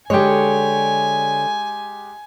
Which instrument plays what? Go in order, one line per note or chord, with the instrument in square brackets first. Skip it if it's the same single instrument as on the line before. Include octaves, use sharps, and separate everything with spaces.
[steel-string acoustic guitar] D3 C#5 [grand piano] G#3 G4 [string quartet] G#5